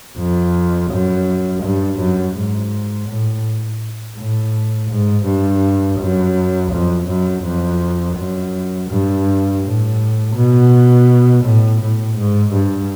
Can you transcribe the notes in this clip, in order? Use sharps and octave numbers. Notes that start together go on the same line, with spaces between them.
F2
F#2
G2
F#2
G#2
A2
A2
G#2
G2
F#2
F2
F#2
F2
F#2
G2
A2
B2
A2
A2
G#2
G2